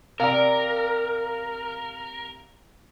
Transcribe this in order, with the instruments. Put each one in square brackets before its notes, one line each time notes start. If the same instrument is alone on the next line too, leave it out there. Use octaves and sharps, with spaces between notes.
[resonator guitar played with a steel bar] C3 D5 [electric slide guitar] A#4 [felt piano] F5 A#5